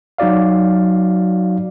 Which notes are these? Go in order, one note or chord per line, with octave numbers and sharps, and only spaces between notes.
F#3 D#4 F#4 D5 F5